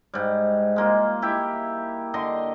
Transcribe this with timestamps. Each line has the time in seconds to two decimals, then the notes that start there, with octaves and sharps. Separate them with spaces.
0.14 G#2 G3
0.76 G#3 A#3 F4
1.22 E4 G4 E5
2.14 D3 D#5 C6